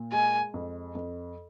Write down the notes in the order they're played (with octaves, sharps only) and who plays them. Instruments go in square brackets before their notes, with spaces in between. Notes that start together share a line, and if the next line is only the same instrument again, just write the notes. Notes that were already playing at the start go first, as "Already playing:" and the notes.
Already playing: [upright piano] A#2
[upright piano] G#3 [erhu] G#5
[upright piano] F2
F2